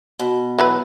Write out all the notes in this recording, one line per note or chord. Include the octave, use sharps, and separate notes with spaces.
B2
E3 F#3 B4